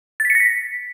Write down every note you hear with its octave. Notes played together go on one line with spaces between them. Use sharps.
A6
B6
C#7
A#6
B6